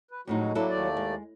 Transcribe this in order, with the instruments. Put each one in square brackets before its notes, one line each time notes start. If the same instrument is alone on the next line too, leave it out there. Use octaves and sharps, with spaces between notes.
[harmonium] B4
[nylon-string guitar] F2 A2 D#4 [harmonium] F#3 G#3 F#4
[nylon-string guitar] F#3 E4 A4 [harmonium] A#3 D4
[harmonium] D#2 A3 D5
[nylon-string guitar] G#3